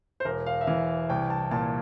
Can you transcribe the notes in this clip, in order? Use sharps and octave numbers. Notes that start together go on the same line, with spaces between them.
C5
E1 A#4
F5
E5
E3 F5
C2 G5
A5
A#2 A5